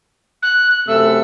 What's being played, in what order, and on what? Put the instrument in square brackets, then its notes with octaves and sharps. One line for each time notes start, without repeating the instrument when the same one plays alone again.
[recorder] F#6
[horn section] F#2 C3 A3 [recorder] E6